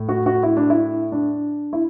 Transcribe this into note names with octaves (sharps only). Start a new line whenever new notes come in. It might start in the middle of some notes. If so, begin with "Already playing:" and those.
Already playing: A2
F#4
F#4
E4
D4
E4
D4
E4